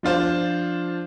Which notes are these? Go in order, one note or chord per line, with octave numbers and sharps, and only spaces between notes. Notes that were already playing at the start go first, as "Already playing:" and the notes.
F3 D4 F4 C5